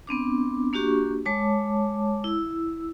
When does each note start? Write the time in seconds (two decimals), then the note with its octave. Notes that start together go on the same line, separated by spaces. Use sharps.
0.07 B3 C4 D4 D6
0.73 A#3 D4 F#4 G4 C#6
1.26 G#3 C#5 A5 D6
2.24 E4 E6